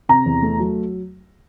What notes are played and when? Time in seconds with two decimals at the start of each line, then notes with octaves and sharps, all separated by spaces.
0.09 C3 A#5
0.26 E2
0.43 A3
0.59 F#3